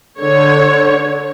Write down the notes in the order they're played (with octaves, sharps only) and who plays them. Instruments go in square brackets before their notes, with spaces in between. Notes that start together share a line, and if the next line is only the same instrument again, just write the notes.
[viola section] D3 C#5